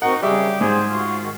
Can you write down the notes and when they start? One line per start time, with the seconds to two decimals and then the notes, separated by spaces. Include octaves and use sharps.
0.02 C4 D#4 F#4 A#4 F#5
0.22 C#3 G3 G4 G#4 E5
0.61 G#2 G#4 C5
0.90 F4 F#4
1.19 D#3 F#4